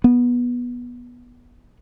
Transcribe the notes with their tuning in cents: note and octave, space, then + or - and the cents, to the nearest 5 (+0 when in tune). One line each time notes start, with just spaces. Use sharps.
B3 -15